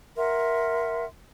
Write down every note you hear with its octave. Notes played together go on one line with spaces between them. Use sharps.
A#4 E5 F#5 C6